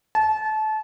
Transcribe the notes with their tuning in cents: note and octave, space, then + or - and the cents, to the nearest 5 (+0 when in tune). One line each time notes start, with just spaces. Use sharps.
A5 -25